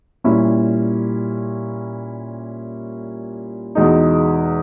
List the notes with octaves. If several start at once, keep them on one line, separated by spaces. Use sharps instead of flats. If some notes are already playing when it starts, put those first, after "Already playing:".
A#2 G3 A#3 C#4 E4
E2 B2 G#3 D#4